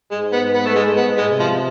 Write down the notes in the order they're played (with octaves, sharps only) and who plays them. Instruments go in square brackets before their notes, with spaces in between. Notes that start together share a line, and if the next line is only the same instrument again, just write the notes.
[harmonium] G#2 [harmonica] G#3
[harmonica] B3
B3
A3
G#3
[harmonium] A2
[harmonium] G#2 [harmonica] B3
[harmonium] A2
[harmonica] G#3
[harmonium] C3
[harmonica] F3